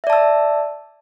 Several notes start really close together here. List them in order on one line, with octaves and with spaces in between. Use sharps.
E5 D5 A5 E6